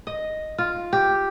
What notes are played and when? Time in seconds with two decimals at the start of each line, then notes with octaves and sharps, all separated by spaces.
0.07 D#5
0.58 F4
0.93 G4